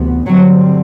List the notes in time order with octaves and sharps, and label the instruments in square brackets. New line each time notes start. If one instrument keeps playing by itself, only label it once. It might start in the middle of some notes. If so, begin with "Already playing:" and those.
Already playing: [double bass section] D2 C3 E3 B3
[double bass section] G2 D3 G3 C4 [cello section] F#3